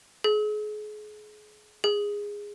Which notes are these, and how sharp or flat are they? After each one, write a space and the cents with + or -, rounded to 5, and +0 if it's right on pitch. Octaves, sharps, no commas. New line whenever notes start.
G#4 +30
G#4 -15